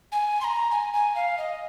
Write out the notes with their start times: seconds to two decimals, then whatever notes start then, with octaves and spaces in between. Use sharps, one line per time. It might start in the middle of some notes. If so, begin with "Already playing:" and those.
0.11 G#5
0.40 C6
0.44 A#5
0.71 G#5
0.93 G#5
1.15 F5
1.37 D#5